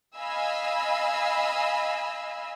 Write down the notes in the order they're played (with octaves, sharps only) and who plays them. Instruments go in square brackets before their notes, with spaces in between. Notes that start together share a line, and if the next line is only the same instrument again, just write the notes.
[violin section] D#5 F5 G#5 B5 E6